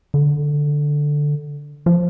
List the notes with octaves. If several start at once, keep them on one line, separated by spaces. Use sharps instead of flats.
D3
F3